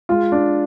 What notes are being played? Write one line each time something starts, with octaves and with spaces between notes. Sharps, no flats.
G#3 F4
D4